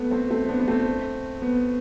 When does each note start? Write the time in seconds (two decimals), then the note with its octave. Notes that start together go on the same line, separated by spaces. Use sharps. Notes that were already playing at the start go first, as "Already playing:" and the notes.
Already playing: A3 B3
0.11 A3 C4
0.30 A3 C4
0.49 B3 D4
0.60 B3
0.68 A3 C4
1.42 B3